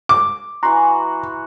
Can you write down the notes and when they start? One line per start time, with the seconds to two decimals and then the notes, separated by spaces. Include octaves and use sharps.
0.09 D6
0.63 E3 F#4 A#5 C6